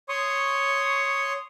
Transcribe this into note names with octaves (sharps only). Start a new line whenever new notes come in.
C#5 C6 C#6 D#6